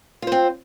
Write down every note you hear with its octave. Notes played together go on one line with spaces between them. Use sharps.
C4 F4 C5